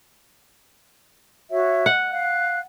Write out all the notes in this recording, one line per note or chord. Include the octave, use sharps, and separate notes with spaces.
F#4 C#5 E5
F#5
F5 F#6